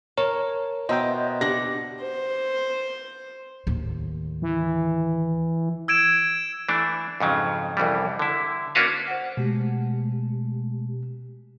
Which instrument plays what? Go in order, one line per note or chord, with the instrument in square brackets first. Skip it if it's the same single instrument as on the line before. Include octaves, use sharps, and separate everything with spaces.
[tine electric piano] A#4 [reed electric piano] C#5 [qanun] A5
[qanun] B2 [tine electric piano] C5 E5 G5 [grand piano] D#5 A#5
[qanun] D4 F#5 [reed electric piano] G4 [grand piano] A#6
[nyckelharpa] C5
[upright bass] D#2 A2
[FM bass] E3
[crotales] E6 G#6 D7 E7
[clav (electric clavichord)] E3 A3 D4
F2 G#2 C#3 F#3
C2 F2 E3 G3
D3 E4
A#3 C#4 D4 F#4 B4 F5
[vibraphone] C5 F#5
[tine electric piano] B2 [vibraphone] G#3 A3 G4